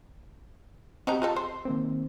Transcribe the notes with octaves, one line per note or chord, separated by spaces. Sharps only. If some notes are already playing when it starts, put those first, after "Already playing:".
F#3 C4 D#4 G4 A#5
G#3 D#4 F4 A4
C5 C6
D#3 A#3 C4